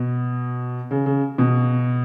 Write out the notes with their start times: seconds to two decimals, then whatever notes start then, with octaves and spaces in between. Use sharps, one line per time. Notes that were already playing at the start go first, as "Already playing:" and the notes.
Already playing: B2
0.91 C#3
1.06 C#3
1.38 B2